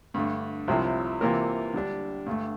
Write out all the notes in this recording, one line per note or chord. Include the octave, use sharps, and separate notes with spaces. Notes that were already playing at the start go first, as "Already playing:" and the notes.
G2 D3 A3
C2 C3 F3 C4 E4
C3 E3 A#3 F4 A#4
D3 G3 D4
G2 D3 A3